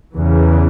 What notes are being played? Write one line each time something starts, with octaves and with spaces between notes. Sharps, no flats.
E2 C#3 E3